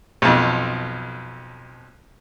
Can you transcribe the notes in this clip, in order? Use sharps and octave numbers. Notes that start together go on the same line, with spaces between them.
B1 F2